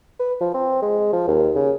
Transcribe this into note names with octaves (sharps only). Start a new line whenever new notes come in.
B4
F3
C4
G#3
F3
D#2
C#3